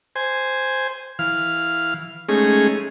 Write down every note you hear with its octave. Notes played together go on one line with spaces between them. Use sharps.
C5 G#5
E3 F5 F6
G#3 A3 C#4 D#4 G#4